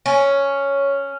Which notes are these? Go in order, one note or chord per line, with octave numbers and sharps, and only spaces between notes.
C#4